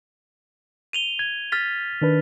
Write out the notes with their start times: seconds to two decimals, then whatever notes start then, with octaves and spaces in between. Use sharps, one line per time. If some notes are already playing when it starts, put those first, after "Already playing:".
0.93 D#7 F7 G7
1.19 G#6
1.52 F6 A6 B6
2.02 D#3 D4 B4